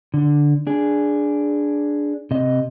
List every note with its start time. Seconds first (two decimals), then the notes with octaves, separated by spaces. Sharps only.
0.14 D3
0.67 D4 G#4
2.31 C3 D#5